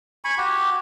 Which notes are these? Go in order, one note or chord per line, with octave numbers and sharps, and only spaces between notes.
G#5 B5 C#6
F#4 G4